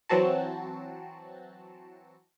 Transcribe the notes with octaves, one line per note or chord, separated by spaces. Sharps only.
E3 F#3 C4 F#4 A5